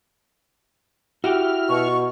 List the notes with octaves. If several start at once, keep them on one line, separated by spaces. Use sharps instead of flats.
E4 F#4 G4 F6
B2 C#6